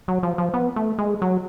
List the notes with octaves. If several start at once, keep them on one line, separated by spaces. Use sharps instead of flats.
F#3
F3
F3
B3
A3
G#3
F#3